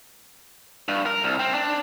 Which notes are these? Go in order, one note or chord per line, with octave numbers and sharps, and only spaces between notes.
G2
A#4
C2
C4
D4